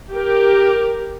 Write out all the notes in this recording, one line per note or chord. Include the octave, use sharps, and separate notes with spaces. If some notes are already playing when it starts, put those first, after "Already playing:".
G4 A#4